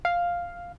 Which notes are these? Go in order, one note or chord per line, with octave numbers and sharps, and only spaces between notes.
F5